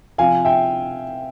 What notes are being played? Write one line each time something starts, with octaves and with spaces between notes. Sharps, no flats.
C3 F3 F5 G#5
E5 G5